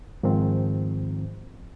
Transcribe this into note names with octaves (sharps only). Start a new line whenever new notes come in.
G#2 D#3 F3 C4